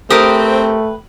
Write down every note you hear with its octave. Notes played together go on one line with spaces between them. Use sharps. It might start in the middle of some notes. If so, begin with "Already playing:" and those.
A3 C4 G4 A#4 B4 G5 D#6